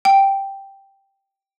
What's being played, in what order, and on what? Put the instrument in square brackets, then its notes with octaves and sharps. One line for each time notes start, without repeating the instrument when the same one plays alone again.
[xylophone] G5